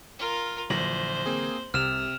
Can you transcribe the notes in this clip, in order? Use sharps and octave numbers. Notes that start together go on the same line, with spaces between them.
F4 A#4
A#1 D3 E3 F#3 C5 A#6 F#7
A#3 C4 G#4
C2 C3 F6 E7 F7